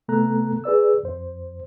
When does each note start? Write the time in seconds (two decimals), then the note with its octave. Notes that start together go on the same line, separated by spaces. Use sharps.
0.08 C3 A3 B3 A4 A#5 F#6
0.64 G#4 B4 D5 E6
1.03 F2 C5